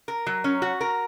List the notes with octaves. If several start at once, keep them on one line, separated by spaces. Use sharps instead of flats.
A#4
F#3
C#4
F#4
A#4